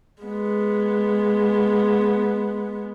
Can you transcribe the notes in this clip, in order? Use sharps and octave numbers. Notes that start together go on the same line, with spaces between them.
G#3 B3